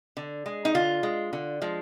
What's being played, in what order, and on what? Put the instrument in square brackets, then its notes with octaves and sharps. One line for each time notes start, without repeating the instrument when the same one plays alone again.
[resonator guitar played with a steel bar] D3
G#3
D#4
D3 F4
G#3
D3
F3 G#3